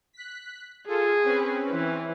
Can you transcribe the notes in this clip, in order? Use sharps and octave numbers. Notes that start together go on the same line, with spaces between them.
F#6 B6
F4 G#4 A4
C4 C#4 B4
E3